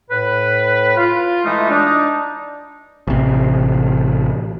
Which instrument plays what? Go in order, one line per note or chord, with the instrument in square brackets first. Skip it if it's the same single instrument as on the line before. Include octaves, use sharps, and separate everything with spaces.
[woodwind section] A2 B4
F4
E3 G#3 A3 D#4 F4
D4 D#4
[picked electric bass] A1 C3